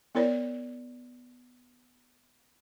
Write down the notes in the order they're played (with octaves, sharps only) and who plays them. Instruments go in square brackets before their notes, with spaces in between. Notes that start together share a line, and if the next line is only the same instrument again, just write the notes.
[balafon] B3 E4 A#4 C#5 D5